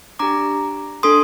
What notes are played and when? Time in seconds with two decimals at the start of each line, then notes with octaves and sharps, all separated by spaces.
0.19 D4 G4 A#5 D6
1.03 D4 A4 C6 D#6